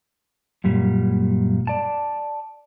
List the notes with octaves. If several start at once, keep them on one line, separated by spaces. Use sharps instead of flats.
F#2 A#2 G3
D5 A5